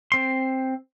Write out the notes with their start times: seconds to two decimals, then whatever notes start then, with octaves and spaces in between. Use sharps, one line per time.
0.12 C4 C6